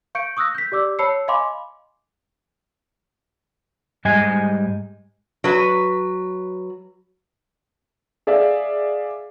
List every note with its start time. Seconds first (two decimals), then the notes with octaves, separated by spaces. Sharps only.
0.15 F5 C#6 G6 C#7 D7
0.37 C#6 D#6 E6 F#6 A#6
0.55 G6 B6
0.72 G4 D5 D6 E6
0.99 C#5 A5 B5 E6 C7 C#7
1.28 D#5 F5 G#5 B5 C6 D6
4.05 G#2 G3 D#5 G#5
5.44 F#3 B4
8.27 G#4 D5 E5 F5